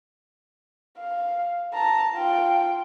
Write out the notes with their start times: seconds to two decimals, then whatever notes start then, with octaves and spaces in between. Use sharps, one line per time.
0.99 F5
1.73 A5 A#5
2.15 F4 G5